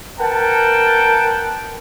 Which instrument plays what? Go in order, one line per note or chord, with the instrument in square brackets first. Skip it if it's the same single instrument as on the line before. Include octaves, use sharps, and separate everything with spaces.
[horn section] A#4 B4 F#5 G5 A5